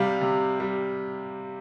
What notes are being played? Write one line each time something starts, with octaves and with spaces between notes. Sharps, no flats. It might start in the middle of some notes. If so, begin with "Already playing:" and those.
Already playing: C3 G3 F5
C3
G3